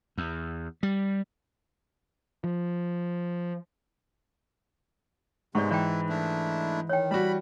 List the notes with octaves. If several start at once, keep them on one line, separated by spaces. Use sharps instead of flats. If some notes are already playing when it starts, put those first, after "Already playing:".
E2
G3
F3
G#2 C3 G#3 B3 D5 C#6
E3 E4 D5 G5
A3 D4 E4
D#3 C#5 G5
G3 F#4 B5